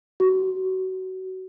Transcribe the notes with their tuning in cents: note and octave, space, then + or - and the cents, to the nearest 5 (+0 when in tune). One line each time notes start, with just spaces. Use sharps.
F#4 +20